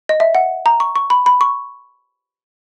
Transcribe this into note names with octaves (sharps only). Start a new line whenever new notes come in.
D#5
E5
F#5
A#5
C#6
C#6
B5
B5
C#6